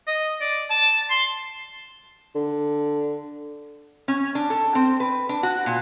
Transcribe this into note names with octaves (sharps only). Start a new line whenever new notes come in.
D#5
D5
A5
C6
D3
C#4
D4
A4
C4
B4
D4
F#4
A#2